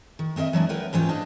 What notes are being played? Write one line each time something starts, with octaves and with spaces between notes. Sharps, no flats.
D#3
B3 C4 A#4 D#5 E5
E3 F#3 G#3 D4
A#4 B4 F#5 G5
G#2 E3 C#4 F4 C5 G5
D4 D#5 F5